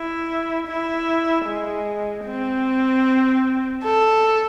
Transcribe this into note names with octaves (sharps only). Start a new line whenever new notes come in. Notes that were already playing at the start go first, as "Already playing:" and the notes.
Already playing: E4
E4
G#3
C4
A4